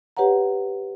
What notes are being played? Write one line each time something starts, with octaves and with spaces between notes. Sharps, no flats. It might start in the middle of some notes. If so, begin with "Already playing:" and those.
G4 B4 C#5 F#5 A#5